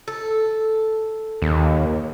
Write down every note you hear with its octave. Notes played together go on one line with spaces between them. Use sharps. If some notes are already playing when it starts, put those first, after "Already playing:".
A4
D#2